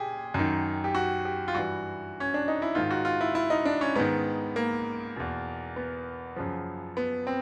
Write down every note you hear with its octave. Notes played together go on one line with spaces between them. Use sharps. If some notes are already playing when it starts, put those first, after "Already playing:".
Already playing: A#2 G4 G#4
F#2 D#3
G4
F#4
G4
F4
G2 E3 F#4
C#4
D4
D#4
E4
G#2 D#3 F4
F#4
F4
E4
E4
D#4
D4
C#4
G#2 D#3 B3
A#3
E2 B2
B3
F#2 C#3 F3
B3
C4